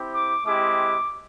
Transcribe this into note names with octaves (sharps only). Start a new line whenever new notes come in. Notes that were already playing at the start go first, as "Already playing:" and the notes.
Already playing: C4 E4 G4
D6
G#3 C4 E4 G4 D6